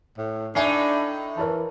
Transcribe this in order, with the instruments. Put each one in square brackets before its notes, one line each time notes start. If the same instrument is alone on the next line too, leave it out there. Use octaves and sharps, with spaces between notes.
[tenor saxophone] A2
[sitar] A2 D#4 [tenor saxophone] D4 [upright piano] E5 G#5 C7
[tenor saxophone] E3 [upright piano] A#4 C#5 A5